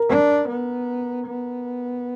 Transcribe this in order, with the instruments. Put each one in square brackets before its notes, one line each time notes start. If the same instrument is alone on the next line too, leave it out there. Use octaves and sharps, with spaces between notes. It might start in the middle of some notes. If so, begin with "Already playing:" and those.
Already playing: [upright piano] A#4
[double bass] D4
B3
B3